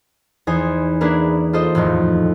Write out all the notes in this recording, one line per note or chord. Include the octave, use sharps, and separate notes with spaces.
E2 D#4 C5 G#5
A#3 D4 E4 G#4 A#4 B4
F4 A4 C5 D#5
D#1 F2 A2 D#3